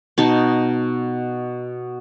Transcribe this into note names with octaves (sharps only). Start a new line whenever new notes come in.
B2 D#4 A5